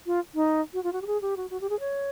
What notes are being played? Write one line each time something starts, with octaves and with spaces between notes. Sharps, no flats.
F4
D#4
F#4
F4
F#4
G4
G#4
G4
F#4
F#4
G4
G#4
C#5